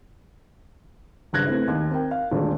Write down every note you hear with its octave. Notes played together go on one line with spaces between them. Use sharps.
F#1 G2 F#6 G#6 A#6
A3 B3 C4 E4
D#2 D#4 G#6
C4 A#4 G5
F5
D#1 D2 G#3 D4